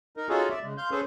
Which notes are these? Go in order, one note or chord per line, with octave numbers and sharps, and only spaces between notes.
D#4 A#4
C#4 D#4 F4 F#4 G#4 A4
D5 E5
C#3 G#3
F5 C6 G6
C#4 G#4 A4 B4 C5